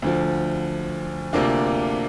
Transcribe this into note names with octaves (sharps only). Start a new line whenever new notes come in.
D2 D3 F3
D2 C3 A#3 D4 F4